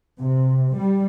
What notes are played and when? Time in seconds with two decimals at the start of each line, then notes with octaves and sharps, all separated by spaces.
0.21 C3
0.76 G3